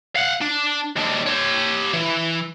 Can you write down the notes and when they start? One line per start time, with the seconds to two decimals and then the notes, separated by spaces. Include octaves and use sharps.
0.16 F5 F#5
0.42 D4
0.97 D#2 D4
1.27 G4 C#5
1.93 E3